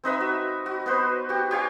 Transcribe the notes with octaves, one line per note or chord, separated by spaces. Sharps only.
C4 D#4 B4 E5
F#4
F#4
B3 F#4 B4 C5
F#4 G4
G4 C#5 F5 G#5